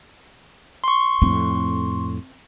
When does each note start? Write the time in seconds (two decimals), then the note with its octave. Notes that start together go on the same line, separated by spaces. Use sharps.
0.84 C6 C#6
1.22 F2 A2 C4